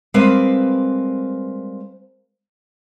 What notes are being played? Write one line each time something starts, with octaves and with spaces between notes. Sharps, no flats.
G3 G#3 C4 A#4 B4 F5